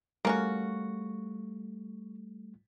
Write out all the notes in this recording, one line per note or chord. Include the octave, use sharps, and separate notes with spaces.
G3 A3 A#3 C#4 F#4